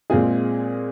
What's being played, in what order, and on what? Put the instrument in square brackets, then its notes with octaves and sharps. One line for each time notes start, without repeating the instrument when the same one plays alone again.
[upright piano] A#2 G#3 C4 F4 G#4